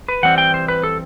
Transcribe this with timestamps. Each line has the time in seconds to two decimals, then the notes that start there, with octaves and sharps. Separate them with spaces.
0.09 B4
0.23 E3 G3 C4 F#5
0.38 G5
0.54 C5
0.68 B4
0.83 A4